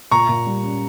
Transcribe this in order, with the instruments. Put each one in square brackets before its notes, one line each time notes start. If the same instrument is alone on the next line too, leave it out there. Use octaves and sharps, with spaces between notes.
[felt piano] A#2 [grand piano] A#5 C#6
[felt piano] A#2
G3
C#4